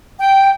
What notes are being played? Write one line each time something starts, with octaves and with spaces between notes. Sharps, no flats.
G5